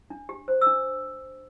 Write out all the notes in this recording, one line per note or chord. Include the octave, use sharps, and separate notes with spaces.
D4
G4
C5
E6
D4